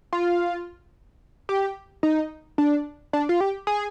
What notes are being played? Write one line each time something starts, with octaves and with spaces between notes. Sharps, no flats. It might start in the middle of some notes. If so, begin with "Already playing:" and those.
F4
G4
D#4
D4
D4
F4
G4
G#4